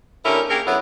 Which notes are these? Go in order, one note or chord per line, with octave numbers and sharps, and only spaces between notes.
D3 A#3 C#4 E4 G4 A#4
A#3 C#4 G4 G#4 A#4
F#2 D3 B3 E4 C#5 F#5